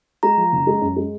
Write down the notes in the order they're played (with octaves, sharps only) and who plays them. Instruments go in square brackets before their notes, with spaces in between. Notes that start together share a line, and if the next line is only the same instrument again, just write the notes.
[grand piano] G#3 [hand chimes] A#5
[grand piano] F3
F#1
G#3
F#2
G#3